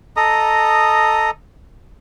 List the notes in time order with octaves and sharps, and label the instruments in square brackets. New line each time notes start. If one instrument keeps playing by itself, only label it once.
[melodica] A4 D#5 A#5 D#6